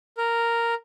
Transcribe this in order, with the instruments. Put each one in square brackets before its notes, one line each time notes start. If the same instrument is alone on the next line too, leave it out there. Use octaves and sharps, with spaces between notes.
[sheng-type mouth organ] A#4